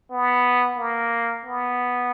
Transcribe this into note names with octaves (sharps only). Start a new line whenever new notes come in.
B3
A#3
B3